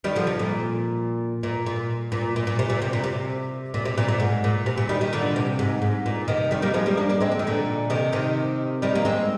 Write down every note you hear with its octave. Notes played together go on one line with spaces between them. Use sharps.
D#3 G3
D3 F3
C3
A#2
A#2
A#2
A#2
A#2
A#2
C3
A#2
C3
A#2
C3
A#2
C3
A#2
A#2
G#2
A#2
C3
A#2
D#3 G3
D#3 G3
A#2 D3
C3
G#2
G#2
A#2
C3 D#3
D#3 G3
G3 A#3
F3 G#3
G3 A#3
A#3 D4
A#3 D4
G#3 C4
D3
D#3
A#2 D3
C3 D#3
C3 D#3
D#3 G3
A#3
G#3 C4